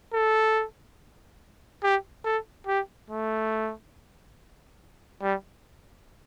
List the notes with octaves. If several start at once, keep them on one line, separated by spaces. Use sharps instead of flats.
A4
G4
A4
G4
A3
G3